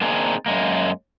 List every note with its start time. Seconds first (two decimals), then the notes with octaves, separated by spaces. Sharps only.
0.01 A#3 C4 D4 D#4 G#4
0.46 F#2 G#3 A#3